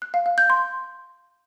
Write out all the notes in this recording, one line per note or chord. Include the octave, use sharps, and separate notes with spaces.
F#6
F5
F5
G6
C6